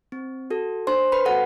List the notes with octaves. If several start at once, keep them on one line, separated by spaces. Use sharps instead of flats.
C4
F#4 A4
D4 C5 C6
B4 B5
F#4 A4 F#5